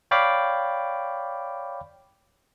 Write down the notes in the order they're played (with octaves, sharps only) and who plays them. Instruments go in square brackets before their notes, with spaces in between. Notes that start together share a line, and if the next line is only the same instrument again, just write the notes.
[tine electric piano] C#5 D5 F5 G5 B5 D6